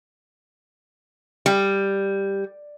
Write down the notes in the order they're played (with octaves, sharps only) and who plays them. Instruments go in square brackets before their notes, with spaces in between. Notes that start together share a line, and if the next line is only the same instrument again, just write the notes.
[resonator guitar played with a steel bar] G3